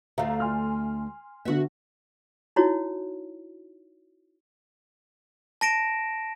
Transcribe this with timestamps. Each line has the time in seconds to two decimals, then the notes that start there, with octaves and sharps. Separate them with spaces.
0.18 D2 A3 E5 F5 A#5
0.40 G#5 C6 F6
1.45 D3 B3 F#4 E5
2.56 D#4 E4 F#4 C#5
5.61 A5 A#6 D7 E7